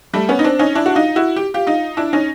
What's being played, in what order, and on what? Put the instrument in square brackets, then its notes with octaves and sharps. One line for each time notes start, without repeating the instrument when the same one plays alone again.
[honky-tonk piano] G3 A3
B3 C#4
D#4
C4 D4
C#4 D#4
D4 E4
F#4
D#4 F4
E4 F#4
G4
F4 G4
D#4 F4
D4 E4
C#4 D#4